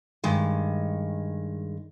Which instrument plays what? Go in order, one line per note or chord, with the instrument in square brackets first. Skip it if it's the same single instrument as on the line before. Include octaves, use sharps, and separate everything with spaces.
[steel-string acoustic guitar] G2 D#3 G#3